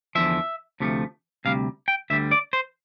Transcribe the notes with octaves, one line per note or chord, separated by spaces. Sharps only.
E2 D3 F3 E5
D2 C3 F3 A3
D2 C3 G3 F5
G5
D2 D3 G3 E5
D5
C5